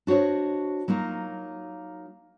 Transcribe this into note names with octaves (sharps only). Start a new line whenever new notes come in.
D4 F#4 C5 C#5 D#5
F#3 A#3 D#4 F4